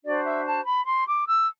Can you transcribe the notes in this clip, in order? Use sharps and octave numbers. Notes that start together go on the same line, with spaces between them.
D4 F#4 C5 D5
E5
A5
B5
C6
D6
E6